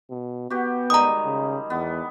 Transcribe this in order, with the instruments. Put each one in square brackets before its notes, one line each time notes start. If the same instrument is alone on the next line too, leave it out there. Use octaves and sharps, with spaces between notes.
[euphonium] B2
[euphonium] B3 [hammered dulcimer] F#4 G4
[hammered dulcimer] D#3 G3 G#3 [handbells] A#5 D#6
[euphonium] C#3
[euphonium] E2 [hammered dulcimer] B3